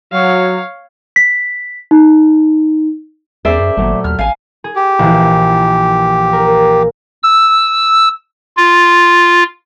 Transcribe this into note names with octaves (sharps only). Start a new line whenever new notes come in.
F#3 C#5 F5
B6
D#4
E2 C#4 G#4 A#4 C5 D5 E5
F#2
G#1 A#2 F#3 A3
D#2 F6
A1 F5 G#5
G#4
G4
A#1 E3
A#4
E6
F4